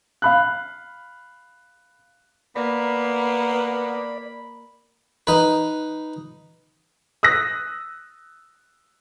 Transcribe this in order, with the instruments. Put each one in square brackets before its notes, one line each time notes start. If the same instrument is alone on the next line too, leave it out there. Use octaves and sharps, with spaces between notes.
[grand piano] F5 B5 F#6
[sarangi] A#3 [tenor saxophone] B3 [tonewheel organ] D5 [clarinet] B5
[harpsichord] D#4 B4
[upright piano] D#6 E6 F#6 A#6